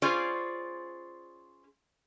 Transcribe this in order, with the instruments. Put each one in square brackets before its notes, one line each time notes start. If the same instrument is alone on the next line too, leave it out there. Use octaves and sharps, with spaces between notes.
[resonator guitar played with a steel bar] C#4 F4 G#4 C5 D5